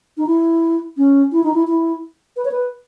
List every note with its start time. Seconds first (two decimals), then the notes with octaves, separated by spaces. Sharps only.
0.17 D#4
0.26 E4
0.97 C#4
1.32 E4
1.44 D#4
1.54 E4
1.67 E4
2.37 B4
2.45 C#5
2.51 B4